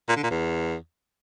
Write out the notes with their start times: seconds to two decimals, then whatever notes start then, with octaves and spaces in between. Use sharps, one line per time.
0.09 A#2
0.16 D3
0.24 A#2
0.31 E2